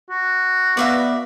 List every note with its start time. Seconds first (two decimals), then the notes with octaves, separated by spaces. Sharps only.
0.10 F#4
0.77 B3 D5 E5 F5